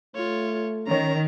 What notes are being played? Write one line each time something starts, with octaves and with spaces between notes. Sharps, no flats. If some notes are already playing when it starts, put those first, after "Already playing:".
A3 F4 C#5
D#3 C#4 C#5 A#5